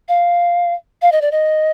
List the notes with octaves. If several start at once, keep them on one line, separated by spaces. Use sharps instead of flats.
F5
F5
D#5
D5
D#5